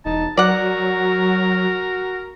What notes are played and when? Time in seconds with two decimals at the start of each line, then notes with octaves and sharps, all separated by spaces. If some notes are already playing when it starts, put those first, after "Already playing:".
0.06 E1 D#4 A5
0.37 F#3 F#4 A#4 D5 F#5